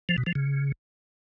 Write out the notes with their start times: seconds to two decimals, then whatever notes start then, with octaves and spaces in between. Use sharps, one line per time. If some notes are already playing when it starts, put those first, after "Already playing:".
0.09 F3
0.18 B2
0.26 F3
0.35 C#3